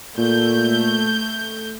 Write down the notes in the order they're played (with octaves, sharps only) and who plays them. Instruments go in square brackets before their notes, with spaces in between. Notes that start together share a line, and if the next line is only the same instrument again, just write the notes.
[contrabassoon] A#2 [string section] A3 G6